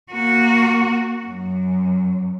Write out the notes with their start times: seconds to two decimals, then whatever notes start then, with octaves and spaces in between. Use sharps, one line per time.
0.12 A#3 F#4
1.26 F#2